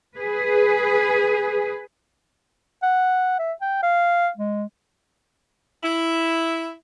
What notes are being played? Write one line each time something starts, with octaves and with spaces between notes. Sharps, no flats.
G#4 B4
F#5
E5
G5
F5
G#3
E4